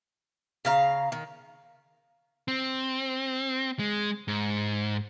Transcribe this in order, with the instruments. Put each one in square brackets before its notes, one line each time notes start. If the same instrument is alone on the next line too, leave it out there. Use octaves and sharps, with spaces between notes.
[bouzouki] C#3 F5 A#5
D#3
[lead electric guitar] C4
G#3
G#2